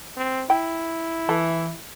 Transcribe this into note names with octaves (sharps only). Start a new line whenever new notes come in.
C4
E4 G5
E3 A4